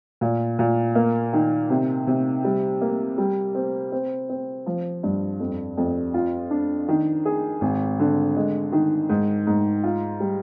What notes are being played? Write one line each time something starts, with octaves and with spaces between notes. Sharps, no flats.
A#2
A#2
A#3
D#3
C3
C3
G3
A#3
G3
C4
C4
C4
F3
G2
F2
F2
F4
D4
D#3
G#4
G#1
D3
G#3
D#3
G#2
G#2
F4
G3